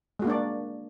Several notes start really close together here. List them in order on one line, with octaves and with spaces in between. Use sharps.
G#3 F#4 A#3 D4 D5